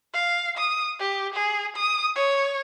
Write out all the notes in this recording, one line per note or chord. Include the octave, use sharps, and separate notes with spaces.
F5
D#6
G4
G#4
D#6
C#5